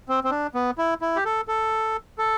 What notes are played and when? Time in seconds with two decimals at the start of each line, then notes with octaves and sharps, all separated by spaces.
0.09 C4
0.24 C4
0.31 D4
0.54 B3
0.78 E4
1.01 E4
1.16 G4
1.25 A4
1.48 A4
2.18 A4